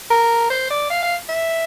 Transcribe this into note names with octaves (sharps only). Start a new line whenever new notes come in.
A#4
C5
D5
F5
F5
E5